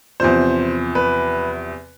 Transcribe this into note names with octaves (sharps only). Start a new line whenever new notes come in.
E2 C3 F3 C5
B4